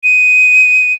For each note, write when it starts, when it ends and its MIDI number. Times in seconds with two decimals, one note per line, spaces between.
0.04 0.93 99